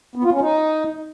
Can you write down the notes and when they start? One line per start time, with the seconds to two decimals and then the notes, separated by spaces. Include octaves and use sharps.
0.15 B3
0.24 F4
0.32 C#4
0.41 D#4